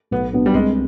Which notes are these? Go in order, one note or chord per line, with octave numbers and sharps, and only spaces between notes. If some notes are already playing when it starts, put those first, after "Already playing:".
B1 B3
B2 B3 D4
G3
C2 G#3